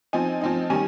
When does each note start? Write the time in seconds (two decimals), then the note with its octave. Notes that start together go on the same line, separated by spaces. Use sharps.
0.13 F3 C4 D#4 G#5
0.41 F3 C4 D#4
0.70 D#3 G3 C#4 G#5